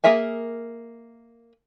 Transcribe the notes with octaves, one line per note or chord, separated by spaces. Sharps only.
A#3 G#4 A#4 E5 G#5